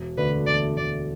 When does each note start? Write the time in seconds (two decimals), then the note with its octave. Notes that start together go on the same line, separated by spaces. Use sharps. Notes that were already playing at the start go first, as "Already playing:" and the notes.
Already playing: E1
0.18 D2 D3 A3 D4 B4
0.47 E1 D5
0.76 D2 D3 A3 D4 D5